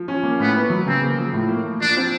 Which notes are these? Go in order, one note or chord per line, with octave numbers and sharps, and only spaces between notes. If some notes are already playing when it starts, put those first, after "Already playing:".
Already playing: F3
C#4
A#3
A2 B3
B3
F#3
C#3 C4
A#3
F3
A2
A#3
F3
F3 D4
C4